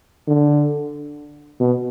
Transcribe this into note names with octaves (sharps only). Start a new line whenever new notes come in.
D3
B2